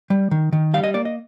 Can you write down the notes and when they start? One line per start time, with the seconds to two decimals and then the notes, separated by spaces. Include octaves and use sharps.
0.10 G3
0.31 D#3
0.52 D#3
0.74 G3 F5
0.84 D#5
0.94 A#3 D5
1.05 D#5